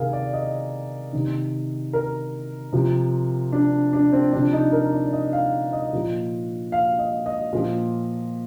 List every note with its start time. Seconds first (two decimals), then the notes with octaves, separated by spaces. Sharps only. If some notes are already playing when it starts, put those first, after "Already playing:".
Already playing: C3 D#3 G#4 A#4 F5
0.13 D5
0.34 D#5
1.13 C3 D#3
1.93 A#4
2.73 C3 F3
3.52 D4
3.93 D4
4.13 C4
4.32 C3 F3 D4
4.53 D#4
4.72 A#4
4.92 D5
5.13 D#5
5.33 F5
5.73 D#5
5.93 A#2 F3
6.72 F5
6.99 D#5
7.26 D#5
7.53 A#2 F3